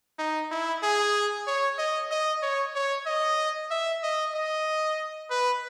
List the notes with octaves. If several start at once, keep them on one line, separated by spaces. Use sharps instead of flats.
D#4
E4
G#4
C#5
D#5
D#5
C#5
C#5
D#5
E5
D#5
D#5
B4